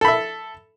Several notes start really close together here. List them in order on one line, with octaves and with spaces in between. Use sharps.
A4 B5 E5